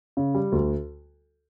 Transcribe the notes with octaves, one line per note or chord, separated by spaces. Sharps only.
C#3
G3
D2